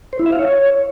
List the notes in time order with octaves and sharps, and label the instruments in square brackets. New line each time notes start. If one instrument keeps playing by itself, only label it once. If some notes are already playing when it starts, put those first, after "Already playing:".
[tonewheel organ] C5
E4
E5
F5
C#5